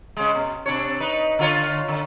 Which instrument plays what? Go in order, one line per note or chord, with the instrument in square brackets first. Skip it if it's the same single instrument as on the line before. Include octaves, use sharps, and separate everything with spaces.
[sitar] C#3 G#3
B2
C3 D4 C#5
D#4 B4
D3 F4 C#5
D3